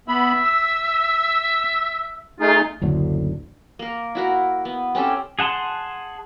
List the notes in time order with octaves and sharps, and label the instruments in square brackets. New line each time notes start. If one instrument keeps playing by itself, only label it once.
[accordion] B3 B5 [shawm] E5
[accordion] E6
[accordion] A3 D#4 G#4 [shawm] F4
[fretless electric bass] F#1 D2 A2 D3
[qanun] A#3 A#4
E4 F#4 A#4
B3
C4 C#4 G4 A4
[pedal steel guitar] G#4 F#5 A5 C6